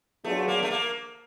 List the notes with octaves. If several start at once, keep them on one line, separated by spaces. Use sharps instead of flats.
F#3 A3 B3 D4 F4 G#4
A#3
A3
A#3